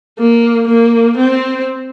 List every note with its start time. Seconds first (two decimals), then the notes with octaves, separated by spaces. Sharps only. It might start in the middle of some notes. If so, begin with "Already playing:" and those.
0.19 A#3
0.68 A#3
1.17 C4